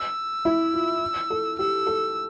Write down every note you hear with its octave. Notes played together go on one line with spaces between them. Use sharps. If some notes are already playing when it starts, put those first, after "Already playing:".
Already playing: E6
E4
F4
A4
G4 E6
A4